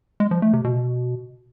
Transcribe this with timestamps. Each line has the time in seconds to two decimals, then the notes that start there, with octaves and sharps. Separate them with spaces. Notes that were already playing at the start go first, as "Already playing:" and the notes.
0.20 G#3
0.31 F3
0.42 A3
0.53 C3
0.64 B2